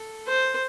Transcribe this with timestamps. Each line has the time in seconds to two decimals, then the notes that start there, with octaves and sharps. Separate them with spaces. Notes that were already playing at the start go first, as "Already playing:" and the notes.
Already playing: A4
0.27 C5